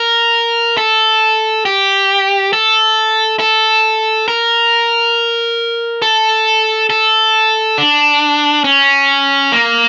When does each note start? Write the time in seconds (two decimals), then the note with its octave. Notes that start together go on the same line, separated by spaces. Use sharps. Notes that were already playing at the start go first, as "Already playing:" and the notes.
Already playing: A#4
0.78 A4
1.65 G4
2.53 A4
3.40 A4
4.28 A#4
6.02 A4
6.90 A4
7.78 D4
8.64 C#4
9.52 A#3